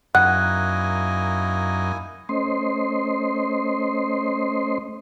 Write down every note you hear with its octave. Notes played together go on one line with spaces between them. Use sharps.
F#2 A#3 D#4 E4 F#5 G#5 F#6
A3 C#4 C5 D#5 C6